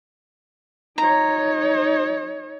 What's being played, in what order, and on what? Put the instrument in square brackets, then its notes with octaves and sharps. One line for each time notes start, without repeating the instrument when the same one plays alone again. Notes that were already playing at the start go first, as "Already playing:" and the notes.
[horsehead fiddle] D#4 C#5 [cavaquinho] A#5